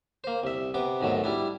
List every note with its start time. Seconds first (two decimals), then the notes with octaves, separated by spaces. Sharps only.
0.24 A#3 C5
0.43 C2 E5
0.74 C3 B3 D6
1.01 B1 G#2 D#3 F#3 A3
1.24 G3 D4 E4